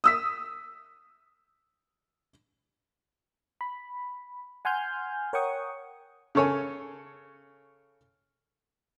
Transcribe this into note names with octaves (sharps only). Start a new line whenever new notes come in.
D#6 E6 B6
B5
F#5 G#5 C6 F6 G6
A#4 C#5 F#5 G5 C#6 D#6
C#3 A4 C#5 G#5